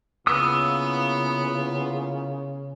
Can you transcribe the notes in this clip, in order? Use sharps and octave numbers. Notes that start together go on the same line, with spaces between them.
C#3 A#3 B3 E4 F4 D#6 E6